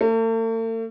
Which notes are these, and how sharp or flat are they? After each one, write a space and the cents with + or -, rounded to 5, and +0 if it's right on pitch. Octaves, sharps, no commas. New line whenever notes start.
A3 +45